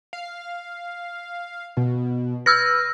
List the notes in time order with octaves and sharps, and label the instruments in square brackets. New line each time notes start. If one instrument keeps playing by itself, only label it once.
[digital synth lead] F5
B2
[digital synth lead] B4 [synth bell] E6 F6 A#6